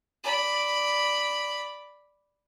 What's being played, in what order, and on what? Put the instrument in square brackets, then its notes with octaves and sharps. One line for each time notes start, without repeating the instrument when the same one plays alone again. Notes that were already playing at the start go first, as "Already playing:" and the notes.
[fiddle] D5 B5